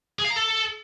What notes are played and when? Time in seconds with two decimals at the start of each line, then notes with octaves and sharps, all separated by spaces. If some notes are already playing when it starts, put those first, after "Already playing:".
0.19 G#4
0.25 F5
0.30 A#5
0.36 A4